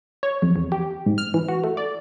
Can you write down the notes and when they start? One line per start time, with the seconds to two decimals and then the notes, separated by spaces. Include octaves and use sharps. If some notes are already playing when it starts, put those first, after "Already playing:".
0.23 C#5
0.42 F2
0.56 E2
0.72 G4
1.06 G#2
1.18 F6
1.34 E3
1.49 F#4
1.64 A3
1.77 D5